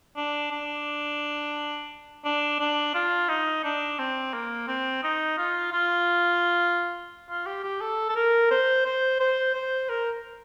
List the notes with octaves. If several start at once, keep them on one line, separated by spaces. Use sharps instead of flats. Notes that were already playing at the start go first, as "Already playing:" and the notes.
D4
D4
D4
D4
F4
D#4
D4
C4
A#3
C4
D#4
F4
F4
F4
G4
G4
A4
A4
A#4
C5
C5
C5
C5
A#4